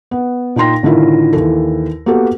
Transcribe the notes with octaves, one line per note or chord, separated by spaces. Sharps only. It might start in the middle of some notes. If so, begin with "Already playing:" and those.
B3
A#2 D#4 G5 C6 A#6
A2 D3 D#3 E4 F4
D#2 E3 A4
A#3 B3 F#4 G4 A4 A#4